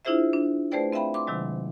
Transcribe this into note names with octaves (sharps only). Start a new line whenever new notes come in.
D4 E4 F4 G#4 C5 E5
D4
A3 G#4 B4 C5 D5 G5
C4 E5 F5 G5 B5
C6 D6
C3 D#3 F#3 G#3